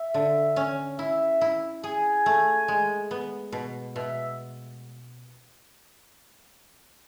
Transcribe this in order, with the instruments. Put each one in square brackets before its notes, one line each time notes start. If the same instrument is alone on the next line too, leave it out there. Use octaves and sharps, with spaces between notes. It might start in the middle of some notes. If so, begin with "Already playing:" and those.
Already playing: [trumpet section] E5
[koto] D3
C#4
[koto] E4 [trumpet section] E5
[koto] E4
[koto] G#4 [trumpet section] G#5
[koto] A3
G#3
B3
B2
[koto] B2 [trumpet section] E5